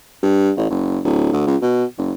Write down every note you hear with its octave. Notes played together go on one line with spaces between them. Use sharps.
G2
A1
F#1
D1
D2
C#2
B2
F#1